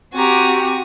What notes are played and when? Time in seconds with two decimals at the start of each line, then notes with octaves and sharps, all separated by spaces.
0.13 C4 F#4 G4 G#5 A#5